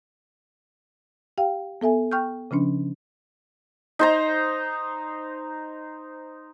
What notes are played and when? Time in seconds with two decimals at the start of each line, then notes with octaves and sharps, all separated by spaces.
1.38 G4 F5 G5
1.81 B3 A4 E5 G#5
2.12 G5 C#6 F6 G6
2.51 C#3 F3 C#4 D4
3.99 D#4 C5 A#5